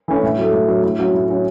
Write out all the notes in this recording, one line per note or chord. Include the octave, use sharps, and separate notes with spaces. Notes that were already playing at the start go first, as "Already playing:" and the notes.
E3 A3 C#4
A2
F#3 A3
A2
F#3 A3
A2
F#3 C#4 F#4
A2
F#3 C#4 F#4